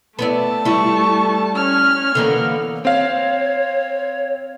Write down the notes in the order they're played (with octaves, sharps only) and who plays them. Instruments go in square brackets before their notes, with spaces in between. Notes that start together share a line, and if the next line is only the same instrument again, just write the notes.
[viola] A3 A5 [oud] B3 E4 D5
[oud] G3 E4 [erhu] C#6
[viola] C#4 C#5 [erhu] F6
[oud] D3 E3 A#3 [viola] B3
[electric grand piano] C4 F5 [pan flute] C#5